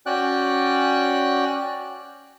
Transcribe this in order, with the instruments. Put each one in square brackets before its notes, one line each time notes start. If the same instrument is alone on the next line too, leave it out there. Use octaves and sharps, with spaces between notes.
[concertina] C#4 F#4 D5 G5 F#6